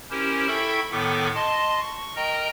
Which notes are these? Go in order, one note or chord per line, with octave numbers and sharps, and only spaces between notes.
C#4 E4 G4 A#4 C5
E4 A4 E5 G5 B5 C#6
A2 D#3 B3 A4 C#6 D6
D#5 A5 C6
C#6
A#4 D#5 G5 A#5